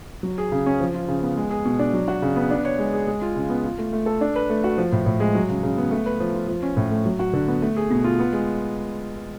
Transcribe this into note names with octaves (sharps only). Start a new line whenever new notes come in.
F#3
G#4
C#3
C#4
F3
F4
C#3
B3
G#3
G#4
B2
D4
F#3
F#4
C#3
B3
D4
C#5
G#3
G#4
G#3
F4
C#3
B3
F4
A3
A3
A4
D4
B4
A3
F#4
F3
A2
A2
G#3
F#3
C#3
C#3
B3
A3
B4
F3
F4
F3
C#4
A2
A3
F#3
F#4
D3
B3
A3
G#4
B2
F4
B3
G#3